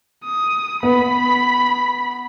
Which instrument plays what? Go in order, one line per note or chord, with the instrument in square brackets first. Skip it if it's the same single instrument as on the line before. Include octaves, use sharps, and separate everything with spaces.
[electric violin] D#6
[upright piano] B3 [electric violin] B5